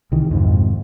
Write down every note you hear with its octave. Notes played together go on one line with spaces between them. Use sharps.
C2 D#3 E3
F2 G#2 C3